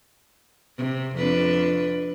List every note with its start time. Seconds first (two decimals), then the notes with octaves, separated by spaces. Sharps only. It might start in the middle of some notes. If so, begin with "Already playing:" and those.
0.78 C3
1.16 F2 D4 B4